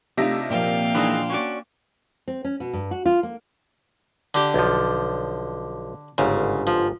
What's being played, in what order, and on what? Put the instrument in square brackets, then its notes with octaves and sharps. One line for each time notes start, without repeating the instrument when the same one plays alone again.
[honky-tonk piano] C3 E5 A#6 [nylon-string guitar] A3 G4 [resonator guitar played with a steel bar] D4 D#4 F4
[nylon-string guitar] A#2 F3 [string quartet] A#3 F5 G5
[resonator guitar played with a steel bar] E3 G#3 D#4 [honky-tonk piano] D4
[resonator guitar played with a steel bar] C#4 F#4 D5
[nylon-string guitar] C4
C#4
B2
G2
F#4
F4
A#3
[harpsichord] D3 G4
[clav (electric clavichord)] B1 F3
[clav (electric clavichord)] G1 G#2 [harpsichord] C#3
[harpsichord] F3